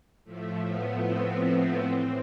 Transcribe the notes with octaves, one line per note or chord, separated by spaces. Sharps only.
A2 F3 A3
B3
C4
A2 E3